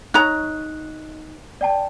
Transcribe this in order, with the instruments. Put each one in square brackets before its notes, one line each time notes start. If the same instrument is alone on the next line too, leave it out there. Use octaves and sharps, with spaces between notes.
[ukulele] D#4 C#5 A#5 [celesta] F#6
[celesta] D5 G5 A5